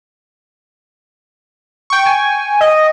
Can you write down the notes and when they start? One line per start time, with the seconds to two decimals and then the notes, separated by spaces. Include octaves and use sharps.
1.90 G5 C#6
2.06 G#5
2.61 D#5